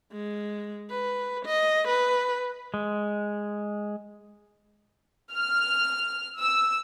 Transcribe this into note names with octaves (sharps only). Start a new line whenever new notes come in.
G#3
B4
D#5
B4
G#3
F6
E6